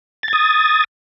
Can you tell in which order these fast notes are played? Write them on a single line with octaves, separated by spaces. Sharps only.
A6 G#6 D#6